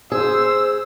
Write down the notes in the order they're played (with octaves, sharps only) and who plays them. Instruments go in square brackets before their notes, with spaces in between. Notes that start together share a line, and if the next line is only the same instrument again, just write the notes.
[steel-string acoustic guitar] G#4 [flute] C5 [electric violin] E6